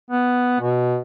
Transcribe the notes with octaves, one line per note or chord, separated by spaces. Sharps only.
B3
B2